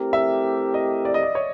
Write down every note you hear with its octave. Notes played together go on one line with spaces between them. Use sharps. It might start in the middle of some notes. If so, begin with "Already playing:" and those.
Already playing: A3 C4 E4 G4 A#4
E5
D#5
D5
D#5
D5
C#5